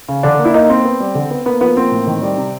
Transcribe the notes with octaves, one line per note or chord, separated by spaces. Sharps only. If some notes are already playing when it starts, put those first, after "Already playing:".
C#3
D3 D4
A#3
E4
A#3 D#4
A#3 C4
B3
G3
D3
B3
A#3 B3
F3 B3
A#3 C4
A2
D#3
G3
C3